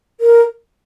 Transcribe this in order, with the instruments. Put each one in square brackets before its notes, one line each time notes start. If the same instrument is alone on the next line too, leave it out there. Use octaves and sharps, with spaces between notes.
[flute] A#4